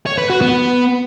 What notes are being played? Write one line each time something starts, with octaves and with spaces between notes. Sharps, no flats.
C#5
B4
F#4
B3